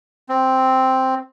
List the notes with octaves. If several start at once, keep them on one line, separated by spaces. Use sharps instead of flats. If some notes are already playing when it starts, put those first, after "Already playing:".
C4